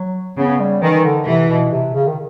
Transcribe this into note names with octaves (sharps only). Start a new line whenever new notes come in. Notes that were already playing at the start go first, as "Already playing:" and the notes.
Already playing: F#3
C#3 B3
G3
D#3 E3
D3
C3 E3
B2
C3
C#3
D#3